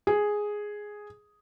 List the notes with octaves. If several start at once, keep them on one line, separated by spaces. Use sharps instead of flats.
G#4